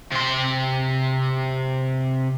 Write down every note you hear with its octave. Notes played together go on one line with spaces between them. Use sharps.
C3 C6